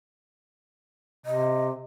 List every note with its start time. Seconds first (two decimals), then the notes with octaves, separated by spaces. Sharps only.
1.26 C3 D#5